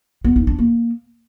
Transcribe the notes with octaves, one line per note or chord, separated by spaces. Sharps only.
B3
D#4
D4
A#3